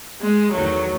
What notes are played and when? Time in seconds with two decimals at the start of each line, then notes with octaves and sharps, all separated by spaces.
0.21 G#3
0.51 E2 D#3 F#3 A3